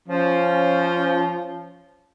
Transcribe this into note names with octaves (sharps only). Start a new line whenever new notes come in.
F3 C#4